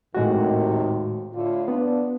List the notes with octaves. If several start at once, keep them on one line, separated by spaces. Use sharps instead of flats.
D#2 A2 C3 D#3 G#3 F#4
A2 D3 F4
B3 D4